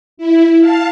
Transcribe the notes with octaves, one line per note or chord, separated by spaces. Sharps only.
E4
F5 A5